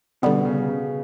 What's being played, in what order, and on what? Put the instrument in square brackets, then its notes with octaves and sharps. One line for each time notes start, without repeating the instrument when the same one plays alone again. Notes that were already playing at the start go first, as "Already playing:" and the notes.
[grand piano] B2 [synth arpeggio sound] D3 G3 B3
[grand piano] C#3
C#3